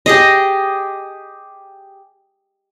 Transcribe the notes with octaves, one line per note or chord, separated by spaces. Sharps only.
G4 G#4 D#5